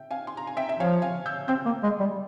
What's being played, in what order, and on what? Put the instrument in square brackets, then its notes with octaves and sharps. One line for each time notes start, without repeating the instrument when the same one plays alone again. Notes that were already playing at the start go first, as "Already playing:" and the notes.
Already playing: [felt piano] E5 G5
F5 G#5
C6
A#5
G#5
E5 G5
E5
[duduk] F3 [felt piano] C#5 F5
[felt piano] F5 G#5
E6 G6
[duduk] C4 [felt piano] E6 G6
[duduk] A#3
G#3
G3